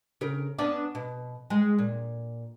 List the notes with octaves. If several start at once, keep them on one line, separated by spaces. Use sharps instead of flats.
C#3 A#4
B3 C#4 D4
B2
G#3
A#2